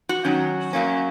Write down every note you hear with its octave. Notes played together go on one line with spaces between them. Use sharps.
F#4
D#3 F#3 C#4
F#2 F#3 A#3 C#4